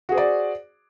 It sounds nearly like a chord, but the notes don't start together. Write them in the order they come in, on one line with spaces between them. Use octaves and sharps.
F#4 G#4 C5 D5